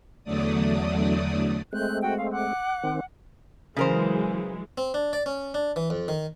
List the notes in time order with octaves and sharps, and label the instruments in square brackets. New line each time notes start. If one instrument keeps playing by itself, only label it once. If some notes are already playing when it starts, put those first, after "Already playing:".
[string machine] E2 D3 F#3 A3 D5 D#6
[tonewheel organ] G#3 A3 C4 [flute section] F#6 G6
[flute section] F#4 G5
F5
F#5 D6 F#6
[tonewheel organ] D#3 C4
[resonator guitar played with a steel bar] C#3 A#4 C5 [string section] E3 F#3 G#3
[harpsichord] C4
D4
D5
C#4
D4
E3
F2
D#3